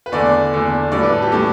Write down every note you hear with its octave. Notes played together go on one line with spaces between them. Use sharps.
B4
E2 D3 A3 D5
E2 D3 A3
A2 G3 D5
B4
A4
G4
A2 G3 A4